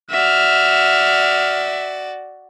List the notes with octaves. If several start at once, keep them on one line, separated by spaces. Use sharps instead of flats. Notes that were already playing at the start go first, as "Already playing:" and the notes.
F#4 D5 E5 F6